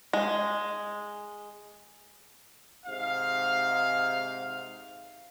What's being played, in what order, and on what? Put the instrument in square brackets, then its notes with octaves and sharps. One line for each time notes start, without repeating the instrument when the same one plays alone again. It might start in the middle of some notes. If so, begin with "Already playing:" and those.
[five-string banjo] G#3
[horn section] G#2 C3 F5